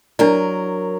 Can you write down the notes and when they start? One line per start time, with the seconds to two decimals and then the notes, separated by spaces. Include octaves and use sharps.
0.19 F#3 D4 E4 A#4 D5